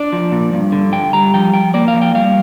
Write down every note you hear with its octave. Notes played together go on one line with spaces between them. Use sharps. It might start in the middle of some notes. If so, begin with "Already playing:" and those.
Already playing: D4 D5
F3
A#2
G2
D3
G2 G5
G3 A#5
F3 G5
F3 G5
A#3 D5
F5
F3
G5
G3 F5